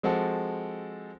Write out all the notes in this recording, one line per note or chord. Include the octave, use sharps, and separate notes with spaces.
F3 G#3 C4 F#4 A4